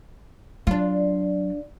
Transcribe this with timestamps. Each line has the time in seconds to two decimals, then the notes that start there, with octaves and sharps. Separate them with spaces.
0.67 F#3 D4 F4